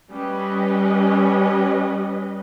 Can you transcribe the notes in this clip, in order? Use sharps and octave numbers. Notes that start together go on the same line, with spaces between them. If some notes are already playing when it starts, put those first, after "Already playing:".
G3 C#4 B4 D#5